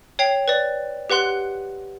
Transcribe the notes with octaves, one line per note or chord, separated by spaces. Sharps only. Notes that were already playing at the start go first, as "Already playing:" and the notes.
C#5 G5 C7 F7
B4 D5
G4 B4 F#5 C6 F#6